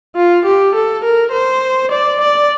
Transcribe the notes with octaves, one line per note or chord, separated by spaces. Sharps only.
F4
G4
A4
A#4
C5
D5
D5